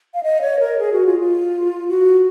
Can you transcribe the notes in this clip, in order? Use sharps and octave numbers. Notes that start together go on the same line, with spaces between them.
F5
D#5
C#5
A#4
G#4
F#4
F4
F4
F#4